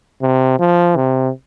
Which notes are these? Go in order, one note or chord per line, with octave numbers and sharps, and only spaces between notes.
C3
F3
C3